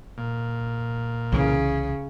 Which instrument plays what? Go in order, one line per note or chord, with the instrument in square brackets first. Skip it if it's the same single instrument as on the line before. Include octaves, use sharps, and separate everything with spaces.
[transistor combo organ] A#2
[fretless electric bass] C2 E3 [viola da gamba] C#3